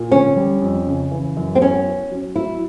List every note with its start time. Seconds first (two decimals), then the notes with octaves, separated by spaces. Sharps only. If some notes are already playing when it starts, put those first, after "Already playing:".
Already playing: A#2
0.12 D3 C#4
0.36 G3
0.62 F2
0.87 C#3
1.11 E3
1.37 F#2
1.55 C4
1.61 B3 C#4
1.86 E4
2.11 F#3
2.36 F#3 E4